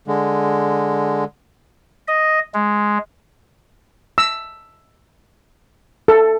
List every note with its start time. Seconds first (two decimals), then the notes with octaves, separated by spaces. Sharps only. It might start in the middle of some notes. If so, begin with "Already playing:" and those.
0.08 D3 G#3
2.08 D#5
2.54 G#3
4.18 E6
6.08 A4